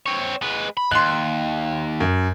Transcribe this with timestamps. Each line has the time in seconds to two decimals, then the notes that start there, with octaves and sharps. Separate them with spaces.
0.06 C4 C#5
0.42 G#3 B4
0.77 B5
0.91 D#2 C6 F#6
2.00 F#2